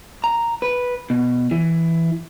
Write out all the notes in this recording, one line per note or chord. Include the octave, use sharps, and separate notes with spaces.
A#5
B4
B2
E3